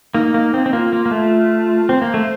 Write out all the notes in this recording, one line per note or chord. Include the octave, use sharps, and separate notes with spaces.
A#3 D#4
A#3
C4
C4
A#3 F4
A#3
A#3
A3
C4 C5
A#3
A3